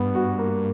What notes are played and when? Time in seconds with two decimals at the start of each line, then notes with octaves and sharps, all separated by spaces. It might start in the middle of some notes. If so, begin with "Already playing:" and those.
Already playing: G2 B3
0.15 F#4
0.39 A#3